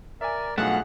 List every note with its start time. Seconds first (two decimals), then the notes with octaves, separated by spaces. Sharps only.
0.21 A#4 D5 E5 G#5
0.58 B1 G2 A3 F4 G#4 F#5 F6 F#6